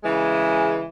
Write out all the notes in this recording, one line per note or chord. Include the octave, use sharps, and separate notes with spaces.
C#3 E3 G#3